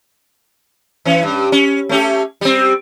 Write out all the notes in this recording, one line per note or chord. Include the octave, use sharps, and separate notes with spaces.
E3 C#4
G2
C#4
A3 C#4 G4
G3 C4